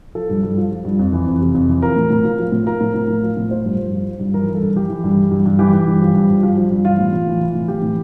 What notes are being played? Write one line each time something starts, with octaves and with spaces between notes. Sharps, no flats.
F3 A4
G2
G2
F3
F3
G2
F2
E3
F2
C3
F2
E3
F3 A#4
A2
A2
F3
F3
A2
F3 A#4
A2
A2
F3
F3
A2
F3 C5
G2
G2
F3
F3
G2
E3 A#4
G2
A4
G2
E3 G4
E3
G2
E3
G2
G2
E3 G4
E3
G2
F3
G2
G2
F3
F3
G2
E3 F4
A2
A2
E3
E3
A2
E3 G4
A2